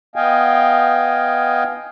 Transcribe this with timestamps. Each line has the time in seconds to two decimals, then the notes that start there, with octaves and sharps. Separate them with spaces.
0.16 B3 D#5 F5 G5 G#5